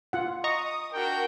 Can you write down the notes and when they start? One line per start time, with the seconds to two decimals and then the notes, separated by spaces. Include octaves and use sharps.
0.13 F4 F#5
0.44 D#5 A#5 C#6 D#6
0.93 D4 F#4 A#4 G5